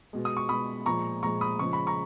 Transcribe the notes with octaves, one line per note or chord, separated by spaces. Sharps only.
B2 G#3
D#6
C#6
B2 G#3 B5 D#6
A#2 F3 G#3 A#5 C#6
A#2 F3 G#3 A#5 C#6
B5 D#6
C#3 F3 G#3 C#6
B5
A#5 C#6